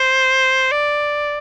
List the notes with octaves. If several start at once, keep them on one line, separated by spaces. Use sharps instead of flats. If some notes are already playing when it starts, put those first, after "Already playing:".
Already playing: C5
D5